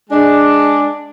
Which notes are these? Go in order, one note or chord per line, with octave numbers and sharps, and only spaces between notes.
G#3 D4